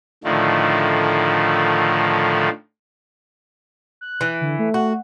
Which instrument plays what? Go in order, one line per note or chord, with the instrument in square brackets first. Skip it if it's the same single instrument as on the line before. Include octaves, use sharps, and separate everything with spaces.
[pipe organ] A2 D3 D#3 F3 A3
[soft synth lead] F#6
[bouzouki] E3
[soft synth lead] D3
A3
[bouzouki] F#4